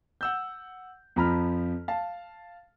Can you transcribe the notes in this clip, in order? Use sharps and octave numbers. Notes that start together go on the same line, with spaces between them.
F#5 E6 G6
F2 F3 A#5 B5 F6
F5 A5